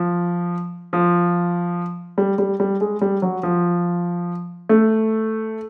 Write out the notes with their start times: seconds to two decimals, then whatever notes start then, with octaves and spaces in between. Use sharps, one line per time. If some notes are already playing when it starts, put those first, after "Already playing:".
Already playing: F3
0.93 F3
2.18 G3
2.38 G3
2.60 G3
2.81 G#3
3.01 G3
3.22 F#3
3.43 F3
4.69 A3